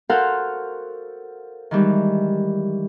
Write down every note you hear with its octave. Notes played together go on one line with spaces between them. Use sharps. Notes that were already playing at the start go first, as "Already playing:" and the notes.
F#4 A4 A#4 C5 F5 F#5
D#3 E3 G3 G#3